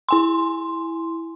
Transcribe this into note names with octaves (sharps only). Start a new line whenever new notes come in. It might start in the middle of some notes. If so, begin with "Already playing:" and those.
E4 G#5 C6